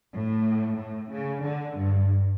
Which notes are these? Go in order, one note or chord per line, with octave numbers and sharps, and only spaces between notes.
A2
A2
C#3
D3
G2